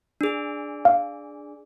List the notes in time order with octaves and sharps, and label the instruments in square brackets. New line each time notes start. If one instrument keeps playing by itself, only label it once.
[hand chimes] D4 G#4
[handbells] F5